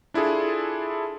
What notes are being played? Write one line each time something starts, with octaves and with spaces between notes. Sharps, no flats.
D4 E4 F4 G#4 A4